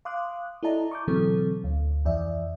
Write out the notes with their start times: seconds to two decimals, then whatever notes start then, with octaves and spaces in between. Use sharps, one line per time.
0.05 F5 C6 D6 D#6 F#6
0.63 E4 A4 D5 D#5 A5 A#5
0.91 C#6 D6 G6
1.08 B2 D3 E3 F#3 C4 A4
1.64 D2
2.05 F2 E3 D5 E5